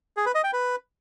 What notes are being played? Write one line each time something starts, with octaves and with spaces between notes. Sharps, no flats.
G#4
B4
D#5
G5
B4